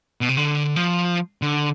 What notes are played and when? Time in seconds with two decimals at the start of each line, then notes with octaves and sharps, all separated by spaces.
0.21 B2
0.29 C3
0.37 D3
0.76 F3
1.42 D3